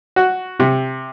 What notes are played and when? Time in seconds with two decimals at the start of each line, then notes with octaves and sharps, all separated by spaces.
0.16 F#4
0.60 C3